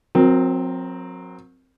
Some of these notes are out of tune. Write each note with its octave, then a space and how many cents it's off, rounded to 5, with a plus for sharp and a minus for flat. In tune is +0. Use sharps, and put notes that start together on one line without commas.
F#3 -30 C4 +0 A#4 +0